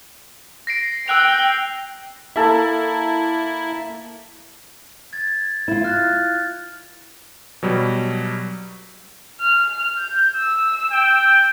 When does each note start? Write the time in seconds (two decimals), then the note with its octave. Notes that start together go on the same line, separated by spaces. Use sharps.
0.67 A#6 C7 D7
1.08 G5 E6 F#6 F7
2.36 A#3 E4 A4 A#4
5.13 G#6 A6
5.68 E4 F4
5.84 F6 F#6 A6
7.63 B2 F#3 G3
9.41 F6
9.98 G6
10.36 E6
10.91 G5